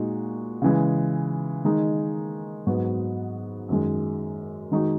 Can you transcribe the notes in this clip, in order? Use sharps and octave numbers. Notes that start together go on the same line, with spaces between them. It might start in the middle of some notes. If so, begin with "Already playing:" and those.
Already playing: A#2 G#3 D#4 F#4
C#3 E3 G#3
D#3 G#3 D#4
G#2 F#3 B3 F#4
F#2 D#3 G#3
D#3 G#3 D#4 F#4